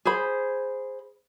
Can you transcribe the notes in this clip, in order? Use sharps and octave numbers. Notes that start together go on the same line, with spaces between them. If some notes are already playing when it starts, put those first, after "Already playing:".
G#4 C5 B5